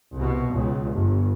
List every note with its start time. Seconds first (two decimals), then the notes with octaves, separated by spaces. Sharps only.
0.15 C2 B2
0.51 C#2
0.92 G1